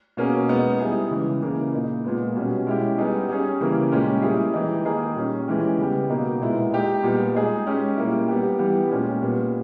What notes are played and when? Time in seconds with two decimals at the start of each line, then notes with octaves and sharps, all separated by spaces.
0.17 B2 A#3 C#4 G#4
0.48 G#3 B3 D#4
0.79 G3 B3 E4 G#4
1.11 C#3 E3 G#3
1.42 C#3 E3 A#3
1.73 A#2 A#3 D#4
2.04 A#2 G#3 B3
2.36 B2 G3 C#4
2.67 G#3 C#4 E4 G4
2.98 G3 B3 D#4 G#4
3.29 G3 C#4 G#4
3.61 C#3 E3 G3 A#3
3.92 A#2 G#3 C#4 G4
4.22 G3 A#3 E4 G#4
4.53 E3 G#3 D#4 G4
4.85 D#3 A#3 D#4 G#4
5.16 A#2 G3 C#4
5.48 E3 G#3 C#4 G4
5.78 C#3 G3 B3 G4
6.10 B2 A#3 D#4
6.40 A#2 G#3 B3 E4
6.72 G#3 D#4 G4
7.03 A#2 G3 B3
7.35 G#3 D#4 G#4
7.66 G#3 C#4 G4
7.96 A#2 G3 A#3 E4
8.28 G3 B3 G4
8.59 E3 G3 B3 G4
8.90 A#2 G#3 C#4 G4
9.22 A#2 G3 B3